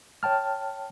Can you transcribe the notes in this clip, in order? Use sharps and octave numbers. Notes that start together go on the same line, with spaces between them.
C#5 G5 A5 F6